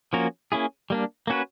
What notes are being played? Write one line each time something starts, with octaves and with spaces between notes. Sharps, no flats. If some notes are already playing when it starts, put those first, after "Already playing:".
F3 A#3 C#4 F#4 A#4
A#3 C#4 E4 G#4
G3 A#3 D4
A#3 C#4 F#4 B4